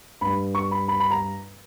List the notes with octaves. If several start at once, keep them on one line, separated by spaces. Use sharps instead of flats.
G2 G3 B5
C#6
B5
B5
B5
A#5